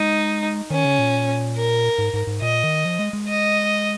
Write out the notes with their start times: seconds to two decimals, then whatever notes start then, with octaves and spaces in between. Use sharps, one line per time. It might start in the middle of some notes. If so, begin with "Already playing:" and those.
Already playing: G#3 D#4
0.70 D#3 C#4
0.85 C#3
0.99 A#2
1.56 A#4
1.98 G#2
2.14 G#2
2.27 G#2
2.41 A#2 D#5
2.64 D#3
2.85 F3
2.99 G#3
3.13 G#3
3.28 D#5